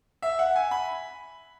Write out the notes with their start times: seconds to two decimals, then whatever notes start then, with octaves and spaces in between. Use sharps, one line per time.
0.22 E5
0.39 F#5
0.56 G#5
0.71 B5